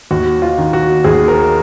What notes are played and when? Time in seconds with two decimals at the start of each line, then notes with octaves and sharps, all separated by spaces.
0.11 D#2 F#4
0.42 F4
0.58 D#3
0.73 F#4
1.04 D#2 G#4
1.28 A#4